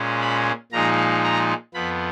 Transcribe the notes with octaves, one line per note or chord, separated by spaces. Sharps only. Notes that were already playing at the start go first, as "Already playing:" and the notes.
Already playing: A#2 G#3 C#4
B5
A#2 F3 G#3 D#4 A#5
A#5
F2 F3 B3 B5